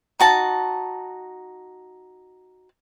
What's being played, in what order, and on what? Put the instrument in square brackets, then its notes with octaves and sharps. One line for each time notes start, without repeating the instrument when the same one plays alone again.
[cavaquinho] D#4 F#4 A5